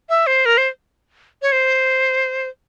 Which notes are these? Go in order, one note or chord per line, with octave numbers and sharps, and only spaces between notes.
E5
C5
A#4
C5
C#5
C5